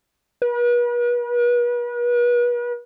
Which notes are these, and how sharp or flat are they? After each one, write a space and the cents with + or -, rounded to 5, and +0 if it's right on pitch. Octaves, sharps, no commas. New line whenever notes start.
B4 -40